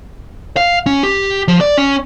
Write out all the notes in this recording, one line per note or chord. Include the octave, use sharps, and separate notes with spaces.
F5
C#4
G4
F3
D5
C#4